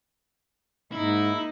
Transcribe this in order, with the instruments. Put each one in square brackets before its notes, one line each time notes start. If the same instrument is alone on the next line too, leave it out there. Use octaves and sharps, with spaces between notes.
[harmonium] G#2 [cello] A#3 D#4 [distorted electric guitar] E4